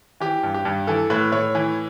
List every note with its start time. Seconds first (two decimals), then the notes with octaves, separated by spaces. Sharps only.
0.20 E3 G4
0.43 G2
0.54 G4
0.65 G2
0.87 E3 A4
1.10 A2 B4
1.32 A2 C#5
1.55 E3